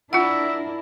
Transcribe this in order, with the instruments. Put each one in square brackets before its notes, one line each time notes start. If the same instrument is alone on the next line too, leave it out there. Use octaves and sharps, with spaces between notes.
[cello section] D4 E4 A#4 [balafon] F4 F#5 [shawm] E5